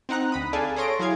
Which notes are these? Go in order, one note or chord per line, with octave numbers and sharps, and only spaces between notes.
C4 D#4 F#5 A#5 F#6
D2 B5 D#6
G#4 A4 D5 F5 G#5 A5
G#4 A4 C#5 C6 A#6 D7
F#3 E4 G#4 F5 G#6